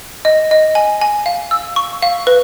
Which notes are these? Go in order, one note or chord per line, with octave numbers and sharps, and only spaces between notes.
D#5
D#5
G#5
G#5
F5
E6
C#6
F5
B4